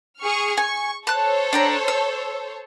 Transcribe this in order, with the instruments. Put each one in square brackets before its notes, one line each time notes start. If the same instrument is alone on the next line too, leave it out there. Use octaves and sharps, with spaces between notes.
[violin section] G#4 C#6 F6
[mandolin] G#5 [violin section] C#6
[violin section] A4 C5 C#5 [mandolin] A5 F#6
[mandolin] D4 G5 A#5
E6